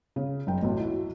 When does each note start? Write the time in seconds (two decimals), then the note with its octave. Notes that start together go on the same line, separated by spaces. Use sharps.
0.16 C#3
0.47 F#1 G5
0.62 A1 D2
0.80 E4 F#4